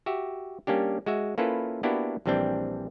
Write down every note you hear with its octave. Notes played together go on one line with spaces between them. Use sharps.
F#4 G4 E5
G3 A#3 C#4 D4 G4
G#3 F#4 E5
A#3 C#4 E4 F4 A4 B4
A#3 B3 D4 E4 F#4 G4
A#1 E3 G3 C4 D4 G5